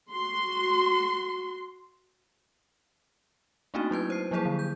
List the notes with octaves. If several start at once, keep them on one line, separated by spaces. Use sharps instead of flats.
F#4 C6
A3 A#3 C4 D4 D#4 F#4
F#3 E4 B4 G#6
C5 C7
F3 F#3 A#3 E4 G#4 C5
D3
G6